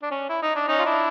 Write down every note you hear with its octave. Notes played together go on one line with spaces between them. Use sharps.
D4
C#4
E4
D#4
D4
C#4 D#4
F4
D4 E4